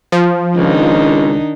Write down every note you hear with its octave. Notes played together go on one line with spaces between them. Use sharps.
F3
C#2 D#3 D4 D#4